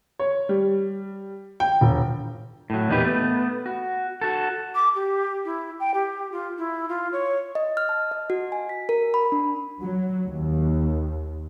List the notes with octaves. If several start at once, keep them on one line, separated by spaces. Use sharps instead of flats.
C#5
G3
G5
E1
A2 F#3
E2 A#2 D#4 G4 B4
A3 B3
F#4
F#4 A4
D6
G4
E4
G5
G4
F4
E4
F4
C#5
D#5
F6
A5
D#5
F#4
G#5
B6
A#4
B5
D4
F#3
D#2